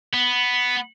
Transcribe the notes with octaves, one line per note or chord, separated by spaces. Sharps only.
B3